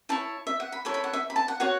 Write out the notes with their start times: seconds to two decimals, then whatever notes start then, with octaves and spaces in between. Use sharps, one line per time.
0.09 E4 C#5 A5
0.47 E5
0.60 F#5
0.72 B5
0.85 E4 A4 C#5
0.94 B5
1.04 F#5
1.13 E5
1.30 B5
1.36 A5
1.48 F#5
1.60 F#4 C#5 F#5